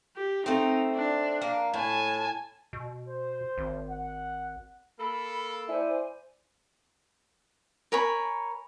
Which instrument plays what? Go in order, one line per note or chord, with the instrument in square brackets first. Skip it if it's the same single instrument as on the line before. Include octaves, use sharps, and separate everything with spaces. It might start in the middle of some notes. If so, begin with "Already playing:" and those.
[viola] G4
[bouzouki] A3 C4 [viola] D#4
[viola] D4
[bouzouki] A#3
[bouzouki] A2 [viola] G#5 A5
[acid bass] B2
[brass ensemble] C5
[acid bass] G#1
[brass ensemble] F#5
[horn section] A#3 A4 [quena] B5
[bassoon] E4 [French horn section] C5 D5 [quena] G#5
[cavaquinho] A#4 C#5 G#5 B5